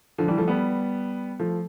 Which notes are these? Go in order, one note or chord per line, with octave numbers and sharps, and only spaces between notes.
D3 F3
E3 G3
F3 A3
G3 B3
F3 A3